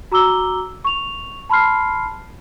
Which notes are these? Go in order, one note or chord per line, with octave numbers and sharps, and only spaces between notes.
F#4 A#5 D6 E6 G7
C#6 F7
A5 B5 C6 F6 C7